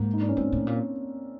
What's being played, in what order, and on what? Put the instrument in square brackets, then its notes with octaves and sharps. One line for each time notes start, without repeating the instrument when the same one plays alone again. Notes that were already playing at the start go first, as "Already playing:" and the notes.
Already playing: [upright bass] G#2 [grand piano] A#3
[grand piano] D#4
D4
C#4
[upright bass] G#2 [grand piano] C4
[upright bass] A2
A#2